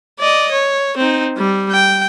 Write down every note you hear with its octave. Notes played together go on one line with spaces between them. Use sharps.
D5 D#5
C#5
C4 D#4
G3
G5